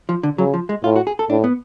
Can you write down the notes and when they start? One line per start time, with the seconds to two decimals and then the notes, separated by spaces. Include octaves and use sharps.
0.09 F3
0.23 D3
0.38 C#3 F#3
0.54 F3
0.69 G#3
0.84 A2 F4
0.96 F#4
1.07 G#4
1.19 A4
1.30 A2 D4
1.44 B3